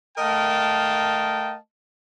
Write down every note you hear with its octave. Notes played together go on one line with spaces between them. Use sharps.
A3 A#4 D#5 F5 G5 A5